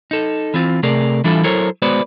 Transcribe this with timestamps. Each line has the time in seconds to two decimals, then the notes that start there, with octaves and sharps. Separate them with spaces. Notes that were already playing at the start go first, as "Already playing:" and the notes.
0.11 D#4 A4
0.54 E3 C4 F4
0.83 C3 A3 G#4 A#4 D5
1.24 E3 G3 D4 E4 F4 A4
1.44 F#3 E4 A4 A#4 C5 C#5
1.82 G#3 B3 F#4 B4 C5 D5